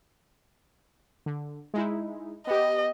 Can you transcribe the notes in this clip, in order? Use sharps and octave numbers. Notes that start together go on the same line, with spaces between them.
D3
G#3 D#4 E4
B3 G4 D#5